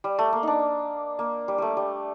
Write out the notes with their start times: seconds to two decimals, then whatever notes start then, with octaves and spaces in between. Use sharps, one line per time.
0.04 G3
0.19 A3
0.33 A#3
0.43 D4 D#4
1.19 A#3
1.48 G3
1.58 G3 A3
1.77 G3